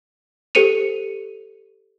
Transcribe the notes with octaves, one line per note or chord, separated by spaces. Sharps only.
G4 A4 C5 C#7 D#7 F7